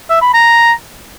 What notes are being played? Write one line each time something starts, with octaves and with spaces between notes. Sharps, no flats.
E5
B5
A#5